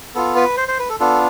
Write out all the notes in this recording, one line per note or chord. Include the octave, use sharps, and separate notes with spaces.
B3 F4 A4
B4
C5
C5
B4
A4
B3 D4 F4 A4